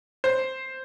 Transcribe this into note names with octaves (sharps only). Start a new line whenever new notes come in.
C5